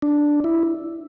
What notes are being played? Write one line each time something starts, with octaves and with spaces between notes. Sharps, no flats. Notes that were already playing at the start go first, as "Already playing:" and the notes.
D4
E4